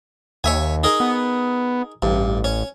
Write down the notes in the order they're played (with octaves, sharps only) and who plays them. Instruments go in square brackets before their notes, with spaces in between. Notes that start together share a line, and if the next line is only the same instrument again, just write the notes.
[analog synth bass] D#2 [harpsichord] C#5 E5 G#5
[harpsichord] D#4 G#4 A#4
[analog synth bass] B3
[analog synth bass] A1 [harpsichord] G2
[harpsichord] C#4